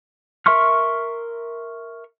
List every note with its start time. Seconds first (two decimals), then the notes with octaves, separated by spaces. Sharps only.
0.46 A#4 E5 C6 C#6 F6